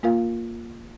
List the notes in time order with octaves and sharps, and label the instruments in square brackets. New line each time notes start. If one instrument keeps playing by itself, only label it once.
[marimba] A#3 F4 A#4 F5